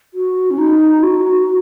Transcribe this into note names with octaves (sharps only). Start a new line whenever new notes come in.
F#4
C#4
D#4
F#4